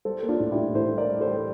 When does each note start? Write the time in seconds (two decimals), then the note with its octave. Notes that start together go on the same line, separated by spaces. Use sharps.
0.05 G3 A4 C5
0.23 A#3
0.28 D4 F4
0.40 A2
0.52 E4 G4
0.57 A2
0.75 A2 A4 C5
0.92 G3
0.98 A#4 D5
1.09 G3
1.21 A4 C5
1.27 G3